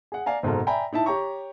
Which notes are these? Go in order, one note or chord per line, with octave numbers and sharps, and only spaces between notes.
G#4 F#5
D5 F5 G#5 A#5
F#1 G#2 B2 C4 A4 A#5
D5 E5 G5 G#5 A#5 B5
D#4 E4 E5 A5
G4 C#5 G5 A#5 C#6